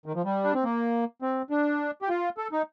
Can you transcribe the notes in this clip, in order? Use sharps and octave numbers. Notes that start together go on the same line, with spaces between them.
D#3
F3
G3
D4
C4
A#3
C4
D4
G4
F4
A4
D#4